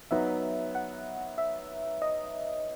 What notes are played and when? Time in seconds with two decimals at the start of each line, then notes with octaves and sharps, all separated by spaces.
0.11 F#3 B3 D#4 E5
0.75 F#5
1.38 E5
2.02 D#5